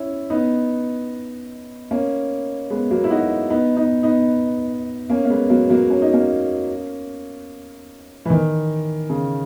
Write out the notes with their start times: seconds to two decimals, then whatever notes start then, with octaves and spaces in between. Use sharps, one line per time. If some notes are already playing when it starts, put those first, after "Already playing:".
Already playing: C#4 E4
0.30 B3 D#4
1.91 A#3 C#4
2.70 G#3 B3
2.91 F#3 A#3
3.04 E4
3.10 D#4 F#4
3.50 B3 D#4
3.77 B3 D#4
4.03 B3 D#4
5.10 A#3 C#4
5.25 A#3
5.30 G#3 B3
5.50 F#3 A#3
5.70 F#3 A#3
5.90 C#4
6.02 D#4
6.13 A#3 C#4
8.25 E3
8.30 D#3
9.10 C#3